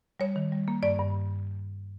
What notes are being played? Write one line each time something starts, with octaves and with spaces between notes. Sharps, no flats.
G3 C#5
D#3
G3
A#3
G2 D5
G2